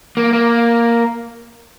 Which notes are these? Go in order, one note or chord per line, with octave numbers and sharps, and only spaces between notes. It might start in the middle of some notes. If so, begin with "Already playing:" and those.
A#3
A#3